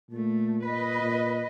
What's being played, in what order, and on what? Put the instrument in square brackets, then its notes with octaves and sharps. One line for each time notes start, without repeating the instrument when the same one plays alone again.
[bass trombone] A#2 [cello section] A3
[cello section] B4 D#5
[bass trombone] A#2